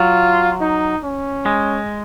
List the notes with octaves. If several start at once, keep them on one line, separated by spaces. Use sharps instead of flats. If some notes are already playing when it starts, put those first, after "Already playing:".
Already playing: F#3 F4
D#4
C#4
G#3